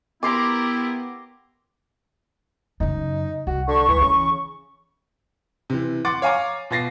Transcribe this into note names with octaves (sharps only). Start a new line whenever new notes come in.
B3 E4 G4 A#4 A#5 C6 D6
F#2 C#3 D#4
C2 F#4
D3 C#6
D2 G2 E3
C#3 E3
C3 E3
F#5 C6 D6 A6
C#5 F5 G#5 A#5 D6
B2 F4 A6 A#6 C7